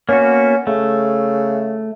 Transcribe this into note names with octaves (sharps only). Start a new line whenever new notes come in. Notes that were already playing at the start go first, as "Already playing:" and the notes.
A#3 B3 C#4 F#4
C#3 A3